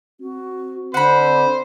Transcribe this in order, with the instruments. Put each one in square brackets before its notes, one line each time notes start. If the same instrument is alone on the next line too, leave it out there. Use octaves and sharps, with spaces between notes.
[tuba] C4 [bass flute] F#4
[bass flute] D3 [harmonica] C5 [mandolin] F#5 B5